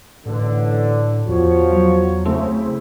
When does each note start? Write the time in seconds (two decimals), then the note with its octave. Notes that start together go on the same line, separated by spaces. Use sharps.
0.26 A1 A2 D3
1.28 E2 F3 F4 F#4 C#5
1.72 F#3
2.25 C#3 A3 C4 E4